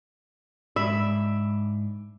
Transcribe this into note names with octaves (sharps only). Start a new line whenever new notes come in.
G#2 D4 E5 B5